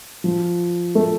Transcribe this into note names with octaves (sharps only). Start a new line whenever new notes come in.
F3
A3